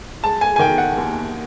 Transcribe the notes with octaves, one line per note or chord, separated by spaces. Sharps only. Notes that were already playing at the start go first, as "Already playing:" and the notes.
G#3 A5
G#5
G#5
D#3 G5
F#5
D#2